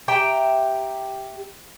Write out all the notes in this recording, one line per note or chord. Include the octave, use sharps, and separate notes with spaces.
G4 E5 G5 A#5